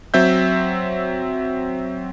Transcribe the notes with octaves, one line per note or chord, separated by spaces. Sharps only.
F#3 C4 E5 G6